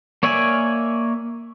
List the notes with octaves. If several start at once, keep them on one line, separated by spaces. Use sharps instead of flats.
A#3 C#5 D5 E5 G#5